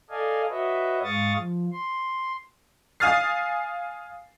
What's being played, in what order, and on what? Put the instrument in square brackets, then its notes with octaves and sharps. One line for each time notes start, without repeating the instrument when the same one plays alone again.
[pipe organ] A4 D5 D#5 F5 G#5
F#4 B4 C#5 D#5 E5
G#2 G#3 F5 C#6 D#6 A6
F3
C6
[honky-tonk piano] F5 G#5 D#6 F6 A6 C7